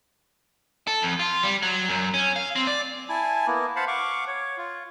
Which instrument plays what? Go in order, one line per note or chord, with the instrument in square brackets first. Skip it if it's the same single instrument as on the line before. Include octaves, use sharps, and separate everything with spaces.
[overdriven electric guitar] A4
F2
F4
G3
F#3
F#2
C#4
F5
C4
D5
[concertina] E4 G#5 A5
A#3 B3 E4
C5 F5 F#5 A5 B5
F5 F#5 C#6 D6
C#5
F4